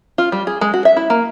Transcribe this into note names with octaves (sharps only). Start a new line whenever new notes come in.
F4
G3
G#4
G#3
F#4
E5
E4
A#3